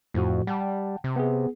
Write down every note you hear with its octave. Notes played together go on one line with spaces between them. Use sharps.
F2 A2 F3 F#4
G3 F#5 G5 A5
C3
B3 G#4